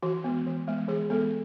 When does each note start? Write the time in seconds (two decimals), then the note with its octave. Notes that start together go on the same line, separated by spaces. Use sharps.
0.03 E3 F#4
0.24 G#3 B3
0.46 E3
0.67 G#3 B3
0.88 E3 G#4
1.10 G#3 B3 A4